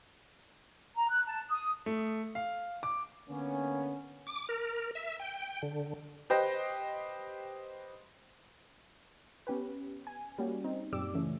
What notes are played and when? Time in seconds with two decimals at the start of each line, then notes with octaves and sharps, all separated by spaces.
0.96 A#5
1.09 F#6
1.26 A5
1.49 D#6
1.86 A3
2.35 F5
2.83 D6
3.29 D3 A#3 B3 C#4
4.27 D6
4.49 A#4
4.95 E5
5.19 G5
5.63 D3
6.30 G4 B4 C5 D#5 G5
9.47 B3 C#4 G4 B4
10.07 G#5
10.38 G3 A#3 C#4 F#4
10.64 C4 D#4
10.93 F#2 A#2 G4 D5 D6 E6
11.13 C#3 E3 A3 C#4